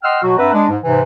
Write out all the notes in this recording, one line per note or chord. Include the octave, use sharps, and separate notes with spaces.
D#5 F#5 G5 C6 E6 F6
B2 F#3 F#4
G2 C4 B4 E5 F#5 A#5
G#3 D4
G#2
G#2 C3 E3